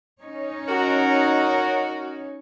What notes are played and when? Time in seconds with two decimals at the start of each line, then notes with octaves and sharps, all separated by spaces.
0.21 C#4 D#4 C#5
0.69 F#4 A#4